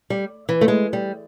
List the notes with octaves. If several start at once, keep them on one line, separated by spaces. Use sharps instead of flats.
G3
E3
A3
G#3
G3